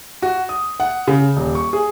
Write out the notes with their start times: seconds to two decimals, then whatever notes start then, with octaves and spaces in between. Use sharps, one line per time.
0.22 F#4
0.49 D#6
0.80 F#5
1.08 C#3
1.36 D#1
1.55 C#6
1.73 G#4